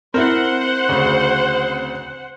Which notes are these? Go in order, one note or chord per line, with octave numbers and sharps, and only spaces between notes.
C4 E4 A#4 C5 F#5
D2 C#3